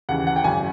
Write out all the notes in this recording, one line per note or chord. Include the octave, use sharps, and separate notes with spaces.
D#2 C#3 E3 F#5
F#5
G5
G#1 F#2 C#3 G#5